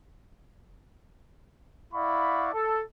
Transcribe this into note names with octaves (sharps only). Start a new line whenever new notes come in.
E4 D5 F5 F#5 B5 C#6
A4